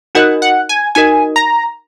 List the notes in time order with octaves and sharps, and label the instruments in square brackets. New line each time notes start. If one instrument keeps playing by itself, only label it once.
[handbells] D#4 F#4 A#4 D#5 [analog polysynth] F#5
[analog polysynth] F#5
G#5
[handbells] D#4 F#4 A#4 D#5 [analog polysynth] G#5
[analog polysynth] A#5